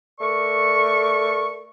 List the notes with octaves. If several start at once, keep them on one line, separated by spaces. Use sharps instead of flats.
A3 A#4 D5 C#6